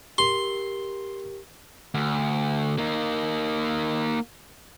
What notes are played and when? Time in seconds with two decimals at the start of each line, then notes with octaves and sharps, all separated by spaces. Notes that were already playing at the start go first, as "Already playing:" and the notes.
0.18 G4 A#4 C6
1.94 D2
2.78 A#3 D#4